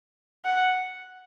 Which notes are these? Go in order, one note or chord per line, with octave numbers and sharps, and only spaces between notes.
F#5